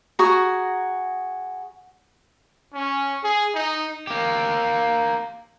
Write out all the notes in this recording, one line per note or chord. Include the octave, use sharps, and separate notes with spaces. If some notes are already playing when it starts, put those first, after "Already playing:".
F#4 G#4 A#5
C#4
G#4
D#4
A#3 G4